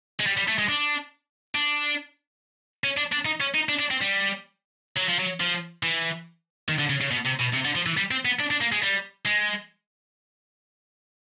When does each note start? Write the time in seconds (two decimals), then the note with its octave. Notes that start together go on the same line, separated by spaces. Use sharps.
0.20 G#3
0.27 G3
0.37 G3
0.48 A3
0.59 G#3
0.69 D4
1.55 D4
2.84 C#4
2.97 D4
3.12 D4
3.26 D#4
3.41 C#4
3.55 D#4
3.69 D4
3.79 D4
3.91 C4
4.01 G3
4.97 F#3
5.08 F3
5.19 F#3
5.40 F3
5.83 E3
6.69 D#3
6.79 D3
6.90 C#3
7.01 C#3
7.11 B2
7.26 C3
7.40 B2
7.54 C3
7.65 D3
7.76 F3
7.86 E3
7.97 G3
8.11 C4
8.25 B3
8.40 D4
8.51 D4
8.61 A#3
8.72 G#3
8.82 G3
9.25 G#3